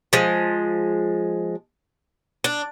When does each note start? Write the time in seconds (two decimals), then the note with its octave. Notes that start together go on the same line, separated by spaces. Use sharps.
0.13 F3 G#3
2.44 D4